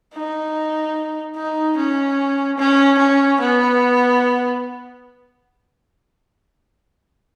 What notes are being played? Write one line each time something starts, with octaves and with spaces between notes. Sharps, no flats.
D#4
D#4
C#4
C#4
C#4
B3